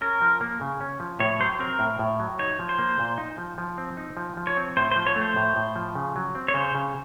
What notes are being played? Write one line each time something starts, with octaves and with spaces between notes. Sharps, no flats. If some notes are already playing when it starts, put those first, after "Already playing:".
C#4 A#4
F3
A#3
C#3
C#4
F3
A2 C#5
F#3 C5
C4 A#4
A2
A2
F#3
D#4 C#5
F3
C5
A#3
A#2
D#4
F3
F3
C4
D#4
F3
F3
C#5
C4
A2 C5
C5
F3
C#5
A3
C5
A2
A2
F3
C#3
F#3
C4
C#5
C#3 C5
C#3